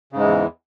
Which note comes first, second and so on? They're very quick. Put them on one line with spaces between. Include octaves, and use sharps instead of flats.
C#3 G#2 G#3 E3 E2